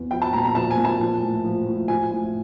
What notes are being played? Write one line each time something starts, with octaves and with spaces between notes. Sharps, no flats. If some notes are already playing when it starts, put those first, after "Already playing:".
Already playing: E2
F3 G5
A5
A#2 A#5
A#5
F3 A5
G#5
A#2
A5
F3
A2
F3
A2
F3 G#5
A2